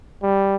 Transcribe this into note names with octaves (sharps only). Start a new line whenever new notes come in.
G3